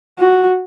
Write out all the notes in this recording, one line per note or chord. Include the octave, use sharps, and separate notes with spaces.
F#4